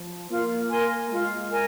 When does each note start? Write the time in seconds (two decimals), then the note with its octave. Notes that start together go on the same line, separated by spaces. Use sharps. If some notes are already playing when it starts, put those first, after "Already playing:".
Already playing: F3
0.30 A#3 F4
0.70 A#4 G#5 C6
1.10 G#3 F4
1.50 A#4 G#5